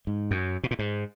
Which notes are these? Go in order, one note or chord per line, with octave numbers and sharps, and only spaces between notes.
G#2
F#2
B2
A#2
G#2